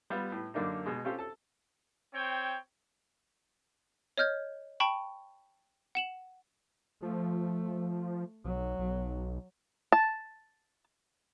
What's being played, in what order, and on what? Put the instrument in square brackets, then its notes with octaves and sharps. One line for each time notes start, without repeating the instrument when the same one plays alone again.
[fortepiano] G3 B3 F4
A2 B4
F#2 D3 A#3 D4 D#4
B2 G#3
C4 C#4 F4 G4 A4 C5
A4 A5
[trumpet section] C4 C#5 G5
[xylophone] C#5 D#5 F6 G6 G#6
G5 A5 B5 C#6
F#5 E7 F#7
[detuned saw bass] F3 [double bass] A3
[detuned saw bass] B1 [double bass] F#3
[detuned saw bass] B1
[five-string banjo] A5